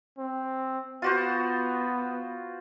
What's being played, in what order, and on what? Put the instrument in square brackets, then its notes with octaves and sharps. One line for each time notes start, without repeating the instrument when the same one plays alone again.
[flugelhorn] C4
[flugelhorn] B3 [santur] F4 F#4 C5